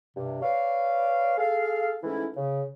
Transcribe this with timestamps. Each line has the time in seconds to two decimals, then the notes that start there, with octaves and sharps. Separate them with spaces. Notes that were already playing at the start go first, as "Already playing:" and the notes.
0.17 G2 C3
0.42 B4 C#5 D5 F5
1.38 G#4 A4 F5
2.03 G#2 E3 A3 C#4 E4
2.37 C#3